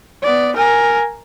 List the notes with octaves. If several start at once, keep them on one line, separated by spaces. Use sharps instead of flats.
B3 D5
A#4 G#5